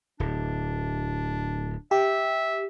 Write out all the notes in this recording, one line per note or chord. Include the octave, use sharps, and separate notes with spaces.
D1 D4
G4 E5